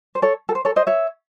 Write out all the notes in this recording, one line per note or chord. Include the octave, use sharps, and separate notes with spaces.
C5
A4 C#5
A4
C5
A4 C#5
C5 D#5
C#5 E5